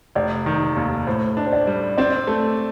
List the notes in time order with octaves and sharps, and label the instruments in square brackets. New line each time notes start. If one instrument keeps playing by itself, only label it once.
[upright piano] F1 [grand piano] D5
[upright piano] D#3
D#2
[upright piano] A2 [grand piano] C5
[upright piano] D4
[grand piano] C5
D5
[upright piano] G3
[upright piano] C4 [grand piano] D5
[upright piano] A3